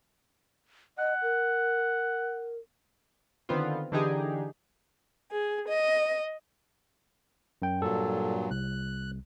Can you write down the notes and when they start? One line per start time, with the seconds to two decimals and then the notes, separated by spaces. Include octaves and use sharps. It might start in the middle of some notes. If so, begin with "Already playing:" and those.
0.98 D#5 F#5
1.22 A#4
3.49 D3 D#3 B3 C4 F4
3.92 D3 E3 D4 D#4 G4 G#4
5.31 G#4
5.67 D#5
7.62 F#2 G5
7.82 G2 A#2 F#3 A4
8.51 C2 F#6